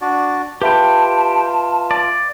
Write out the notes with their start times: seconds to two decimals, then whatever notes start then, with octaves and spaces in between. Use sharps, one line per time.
0.01 D4 F#4 D5
0.62 F4 G4 B4 E5 G5 A5 B5
1.91 D5